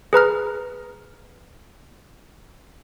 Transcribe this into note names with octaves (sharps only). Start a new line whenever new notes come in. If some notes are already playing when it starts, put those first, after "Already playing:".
G#4 B4 A#5 F6